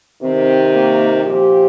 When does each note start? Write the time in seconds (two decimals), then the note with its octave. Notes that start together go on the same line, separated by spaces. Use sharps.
0.21 C3 D#3 C4
0.73 A#3
1.24 A#2 F3 G4